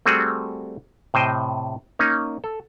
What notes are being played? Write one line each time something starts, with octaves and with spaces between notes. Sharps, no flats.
G3 A3 C4 F#4 G#4
A2 C3 C5 D#5 G5
A#3 C#4 D#4
A4